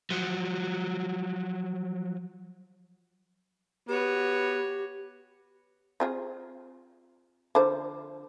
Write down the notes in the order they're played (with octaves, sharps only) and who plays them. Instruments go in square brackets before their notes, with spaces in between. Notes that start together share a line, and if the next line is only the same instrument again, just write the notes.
[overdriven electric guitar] F3 F#3
[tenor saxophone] B3 [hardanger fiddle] F#4 C#5 [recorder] G4
[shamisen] C4 F4 G#4
D3 F3 C5